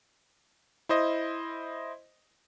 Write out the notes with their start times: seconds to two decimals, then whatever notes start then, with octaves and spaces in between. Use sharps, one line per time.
0.89 E4 C5 D#5